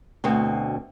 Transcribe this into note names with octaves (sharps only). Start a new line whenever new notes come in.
D2 B2 C4